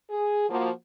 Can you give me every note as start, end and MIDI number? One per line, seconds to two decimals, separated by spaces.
0.10 0.48 68
0.50 0.70 53
0.50 0.70 58
0.50 0.70 66